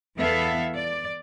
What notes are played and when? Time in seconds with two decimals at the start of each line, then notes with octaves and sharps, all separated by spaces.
0.19 E2 B3 E4 A4 E5 F5
0.74 D5